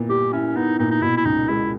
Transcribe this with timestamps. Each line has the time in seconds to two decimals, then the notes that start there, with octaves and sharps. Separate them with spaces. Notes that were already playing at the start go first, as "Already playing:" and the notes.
Already playing: A#2 B3 E4
0.09 G3 G4
0.33 C#4 E4
0.56 B3 D#4
0.79 A#2 D#4
0.91 D#4
1.02 B2 E4
1.17 E4
1.25 C#2 D#4
1.48 G#3 E4